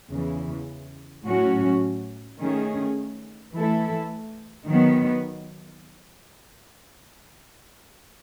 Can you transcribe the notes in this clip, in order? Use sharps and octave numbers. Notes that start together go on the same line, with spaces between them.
E2 C#3 E3
A2 F#3 C#4 F#4
D#3 A3 C#4 G#4
E3 A3 E4 A4
D#3 F#3 B3